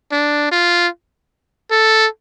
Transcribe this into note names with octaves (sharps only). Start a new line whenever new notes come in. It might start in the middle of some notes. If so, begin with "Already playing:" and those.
D4
F4
A4